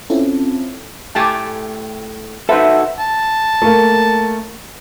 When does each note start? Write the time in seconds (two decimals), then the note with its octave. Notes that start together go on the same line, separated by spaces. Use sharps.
0.10 C4 C#4 E4 F4 A4
1.15 A2 A3 G4 G#5 A5
2.49 D#4 F#4 A4 B4 C5 E5
2.99 A5
3.62 A3 A#3